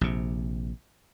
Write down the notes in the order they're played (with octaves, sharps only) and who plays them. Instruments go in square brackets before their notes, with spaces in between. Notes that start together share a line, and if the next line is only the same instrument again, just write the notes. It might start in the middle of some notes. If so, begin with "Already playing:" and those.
[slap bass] A#1 C3